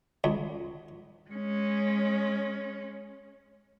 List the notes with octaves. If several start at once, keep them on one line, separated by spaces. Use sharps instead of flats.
C#2
G#3 C#4